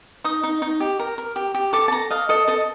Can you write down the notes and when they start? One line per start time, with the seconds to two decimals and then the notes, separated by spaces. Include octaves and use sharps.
0.24 D#4 D#6
0.43 D#4
0.62 D#4
0.80 G4
0.99 A#4
1.18 A#4
1.36 G4
1.54 G4
1.73 A4 D6
1.88 A5
1.92 A4 A#5
2.10 D#5 F5
2.29 A4 D#5
2.48 A4 D#5